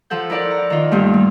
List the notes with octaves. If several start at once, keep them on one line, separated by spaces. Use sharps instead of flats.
F3 A4 F#5 G6
E4 A#4 D5 F#5
A#5
D#3 F4
G2 A#2 G3 A3
G3